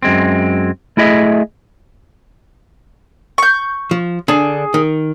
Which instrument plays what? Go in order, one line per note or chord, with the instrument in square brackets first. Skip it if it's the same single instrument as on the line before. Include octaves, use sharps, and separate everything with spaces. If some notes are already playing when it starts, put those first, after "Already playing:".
[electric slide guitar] F#2 G#3 C4
A3 E4 G#4 D#5 E5
[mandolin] C#6 G6
[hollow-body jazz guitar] F3
[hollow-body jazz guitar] D3 D4 [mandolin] G#4
[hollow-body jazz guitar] D#3